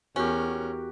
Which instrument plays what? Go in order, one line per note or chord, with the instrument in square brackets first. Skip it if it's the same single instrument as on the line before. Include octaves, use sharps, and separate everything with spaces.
[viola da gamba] E2 A#4 [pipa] C#4 [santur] F#4 G4